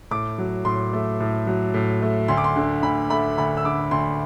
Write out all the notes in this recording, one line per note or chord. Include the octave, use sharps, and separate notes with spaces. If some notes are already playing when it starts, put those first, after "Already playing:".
A2 D6
F#3
A2 C6
A3
A2
F#3
A2
A3
D2 C6
D6
C6
D3
D2 B5
A3 B5
D2 B5
E6
D3 D6
D2 C6